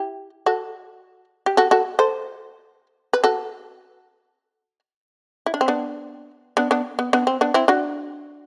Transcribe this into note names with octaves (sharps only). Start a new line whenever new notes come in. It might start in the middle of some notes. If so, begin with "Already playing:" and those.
Already playing: E4 G4
F#4 A4
G4
F#4 A4
F#4 A4
A4 C5
B4
F#4 A4
E4
D4
C4
B3 D4
B3 D4
B3 D4
B3
B3 D4
C4
B3 D4
C4 E4
D4 F#4